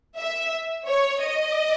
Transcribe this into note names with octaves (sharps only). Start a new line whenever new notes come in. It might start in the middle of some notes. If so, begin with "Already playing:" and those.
E5
C#5
D#5